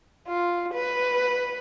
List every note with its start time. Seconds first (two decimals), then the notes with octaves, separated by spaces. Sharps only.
0.28 F4
0.74 B4